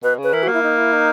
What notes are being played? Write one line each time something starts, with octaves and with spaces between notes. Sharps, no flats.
B2 B4
C#3
B4
E3 A#4
A#3 F#4
E4
D#4
E4
D#4